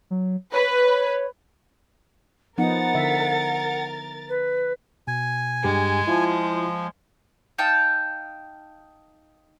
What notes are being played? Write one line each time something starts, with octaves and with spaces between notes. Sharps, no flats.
F#3
B4 C#5
F3 B3 D#4 A#4 F#5 A6
D3 E5
B4
B2 G#5
G2 G#3 G4 G#4
F3 E4 F4
D#4 F5 G5 A5